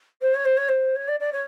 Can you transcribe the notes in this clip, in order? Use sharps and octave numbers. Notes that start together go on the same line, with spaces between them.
C5
C#5
C5
C#5
C5
C#5
D5
D5
C#5